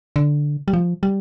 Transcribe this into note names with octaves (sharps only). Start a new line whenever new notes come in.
D3
G3
F3
G3